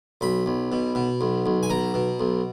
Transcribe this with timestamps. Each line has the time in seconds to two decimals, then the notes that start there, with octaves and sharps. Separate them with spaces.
0.21 B1 B5
0.46 B1
0.72 B2
0.95 B2
1.21 B1
1.46 B1
1.63 G#5
1.70 B2 A#5
1.94 B2
2.20 B1